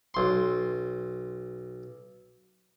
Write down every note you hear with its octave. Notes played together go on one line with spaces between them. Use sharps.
B1 C6